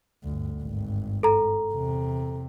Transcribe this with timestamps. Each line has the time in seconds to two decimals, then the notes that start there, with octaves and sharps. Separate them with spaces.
0.24 G1 D2
0.61 G#1 G2
1.23 A4 A#5
1.72 E2 C3